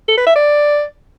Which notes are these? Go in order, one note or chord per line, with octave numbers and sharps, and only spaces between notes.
A4
B4
E5
D5